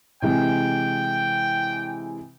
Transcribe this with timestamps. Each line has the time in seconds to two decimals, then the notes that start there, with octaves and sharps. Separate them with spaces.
0.22 C3 E3 G#3 G5